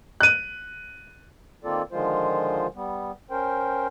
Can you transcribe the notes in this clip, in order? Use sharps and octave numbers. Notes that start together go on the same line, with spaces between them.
F#6 D#7
D#3 A#3 C4 F4 A4 D5
D3 D#3 F3 G#3 F4 C5
G3 B3
C#4 A#4 C5 G5